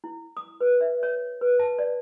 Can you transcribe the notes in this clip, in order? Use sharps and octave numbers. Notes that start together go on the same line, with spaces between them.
E4
D#6
B4
E5
C#5
B4
A5
D5